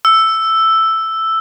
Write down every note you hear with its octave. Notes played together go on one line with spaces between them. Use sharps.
E6